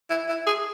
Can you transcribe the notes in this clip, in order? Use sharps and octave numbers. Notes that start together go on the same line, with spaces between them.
E4
E4
G#4